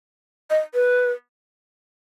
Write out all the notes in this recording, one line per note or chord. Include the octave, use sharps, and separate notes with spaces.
D#5
B4